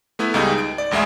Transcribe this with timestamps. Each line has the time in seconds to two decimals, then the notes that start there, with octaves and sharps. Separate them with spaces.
0.19 A3 B3 E4
0.34 C#2 G3 D#4 G#4
0.58 D7
0.78 D5
0.91 A1 D2 G#3 G#4 E5